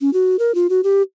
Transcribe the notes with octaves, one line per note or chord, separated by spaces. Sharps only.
C#4
F#4
A#4
F4
F#4
G4